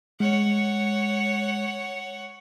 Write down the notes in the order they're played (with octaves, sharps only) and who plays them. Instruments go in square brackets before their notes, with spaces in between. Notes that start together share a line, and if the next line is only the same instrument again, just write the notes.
[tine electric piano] G#3 [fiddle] C#5 F#5